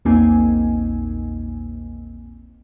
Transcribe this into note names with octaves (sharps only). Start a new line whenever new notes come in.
A#1 E2 A#3 C4 D#4 G#5